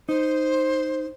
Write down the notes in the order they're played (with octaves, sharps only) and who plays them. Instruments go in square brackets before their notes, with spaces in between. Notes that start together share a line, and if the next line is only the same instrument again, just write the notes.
[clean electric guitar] D#4 [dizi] C5